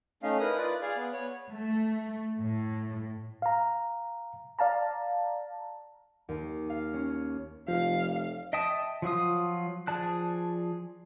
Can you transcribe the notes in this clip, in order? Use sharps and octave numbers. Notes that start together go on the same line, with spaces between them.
A3 C#4 D#4 F5
D#4 E4 A#4 B4 D#6
F4 B4 D5
G#4 D5 F5
B3
B3 C#5
A3
A2
F5 A#5
D5 F5 A5 A#5
D#2
F5
C#4
F1 F3 F5
D#5 E5 G5 A5 D#6
F3 F#3 F4 D#6
F3 G#4 D5 A5 F#6